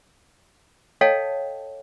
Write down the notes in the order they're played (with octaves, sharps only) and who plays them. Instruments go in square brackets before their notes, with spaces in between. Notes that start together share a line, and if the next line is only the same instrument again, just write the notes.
[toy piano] A4 C#5 D#5 F5 G5 A5